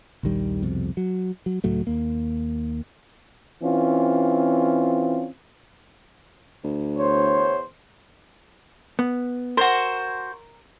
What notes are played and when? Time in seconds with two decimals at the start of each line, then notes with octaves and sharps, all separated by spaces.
0.23 A#1 D#2 D#3 G3
0.62 C2 F2 B2
0.97 F#3
1.46 F#3
1.64 C#2 A2 F#3 A3
1.87 D#2 A#3
3.63 E3 C4 C#4 F4
6.64 D2
6.98 E2 C5 C#5
8.99 B3
9.57 F#4 A#4 C5